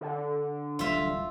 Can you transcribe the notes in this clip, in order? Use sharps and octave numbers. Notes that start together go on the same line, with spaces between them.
D3
D1 A1 G3 F4 E5